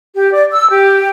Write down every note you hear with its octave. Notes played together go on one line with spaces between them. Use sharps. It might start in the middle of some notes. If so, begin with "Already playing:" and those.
G4
D5
E6
G4